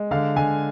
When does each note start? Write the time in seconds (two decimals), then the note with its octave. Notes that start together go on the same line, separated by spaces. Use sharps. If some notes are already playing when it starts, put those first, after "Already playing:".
Already playing: G#3
0.11 D3 F5
0.36 D3 G#5